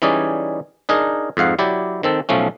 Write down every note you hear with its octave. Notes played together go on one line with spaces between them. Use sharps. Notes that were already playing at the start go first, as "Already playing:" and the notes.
E3 G3 C#4 D#4 G#4 D5
D4 D#4 G#4 A#4
F2 G#2 F5 F#5
F#3 E4 G4 D5
D#3 C4 A4
B1 F3 A3 C#4